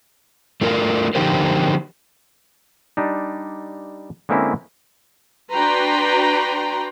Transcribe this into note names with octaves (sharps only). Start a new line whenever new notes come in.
A3 D4 F4 A#4
D3 F3 D#4 G4 A#4 C5
G3 D4 D#4
D3 G#3 A#3 C4 C#4 E4
D4 F#4 B4 G5 A#5 C6